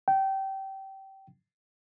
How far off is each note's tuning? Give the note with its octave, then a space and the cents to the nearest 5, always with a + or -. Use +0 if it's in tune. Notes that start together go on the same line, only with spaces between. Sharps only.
G5 -20